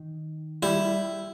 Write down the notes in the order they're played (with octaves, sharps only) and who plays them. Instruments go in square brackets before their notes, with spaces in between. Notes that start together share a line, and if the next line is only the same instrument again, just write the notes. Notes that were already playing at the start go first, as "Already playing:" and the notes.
Already playing: [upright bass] D#3
[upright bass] G3 [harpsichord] E4